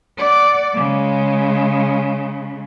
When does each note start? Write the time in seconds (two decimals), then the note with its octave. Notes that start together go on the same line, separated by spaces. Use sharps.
0.18 D5 F#5
0.74 C#3 G#3